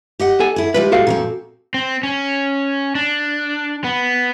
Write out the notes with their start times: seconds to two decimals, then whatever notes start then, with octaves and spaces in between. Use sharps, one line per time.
0.19 G4 D#5 F#5
0.40 A4 G#5
0.56 E4 G#4
0.74 G3 G#3 F4 B4
0.92 F#4 A4 F5
1.07 A#2 A3 C4
1.74 C4
2.03 C#4
2.95 D4
3.84 B3